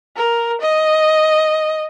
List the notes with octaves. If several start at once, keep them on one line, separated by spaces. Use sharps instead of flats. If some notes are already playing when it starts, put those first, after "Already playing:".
A#4
D#5